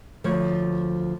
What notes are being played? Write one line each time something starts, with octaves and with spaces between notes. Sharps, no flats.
D2 F3 C#5